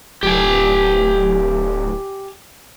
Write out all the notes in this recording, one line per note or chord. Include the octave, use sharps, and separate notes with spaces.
D1 G4 G#5